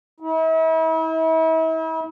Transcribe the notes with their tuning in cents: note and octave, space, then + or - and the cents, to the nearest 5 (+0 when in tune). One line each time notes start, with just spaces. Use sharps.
E4 -40